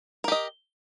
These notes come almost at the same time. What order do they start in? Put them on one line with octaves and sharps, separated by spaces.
A#4 G4 D#5